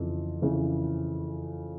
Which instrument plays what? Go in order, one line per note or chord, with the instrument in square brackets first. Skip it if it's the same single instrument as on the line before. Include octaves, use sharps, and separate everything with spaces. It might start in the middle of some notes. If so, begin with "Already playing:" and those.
Already playing: [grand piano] F2 C#3 E3
F2 C#3 E3